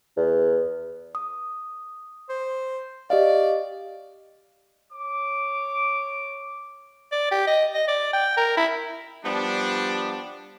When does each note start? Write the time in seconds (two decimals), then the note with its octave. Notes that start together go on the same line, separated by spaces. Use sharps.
0.17 E2
1.15 D#6
2.29 C5
3.10 G4 D5 D#5 F5
4.92 C#5 D6
7.12 D5
7.31 G4
7.47 D#5
7.74 D#5
7.88 D5
8.13 G5
8.37 A#4
8.57 E4
9.24 F3 G3 B3 D4